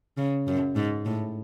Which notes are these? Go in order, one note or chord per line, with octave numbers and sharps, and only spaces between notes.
C#3
F#2
G#2
A2